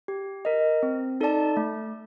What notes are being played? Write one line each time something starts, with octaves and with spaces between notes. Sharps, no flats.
G4
A#4 D#5
C4
D#4 A4 D5 A5
A3